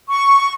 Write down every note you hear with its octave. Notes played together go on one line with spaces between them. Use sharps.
C#6